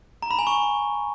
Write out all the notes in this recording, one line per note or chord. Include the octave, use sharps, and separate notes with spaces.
A#5
B5
G#5
C#6